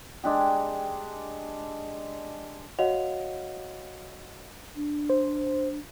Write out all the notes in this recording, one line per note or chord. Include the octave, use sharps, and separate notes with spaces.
G#3 D4 G4
F#4 C#5 D#5 F5 F#5 F7
D4
C5